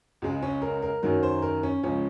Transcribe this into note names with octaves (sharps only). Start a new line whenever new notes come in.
C#2 C#3 G#3
C#4
A#4
A#4
F#2 D#3 F#3 A#4
C5
A#4
C#4
C#2 C#3 F3 C#4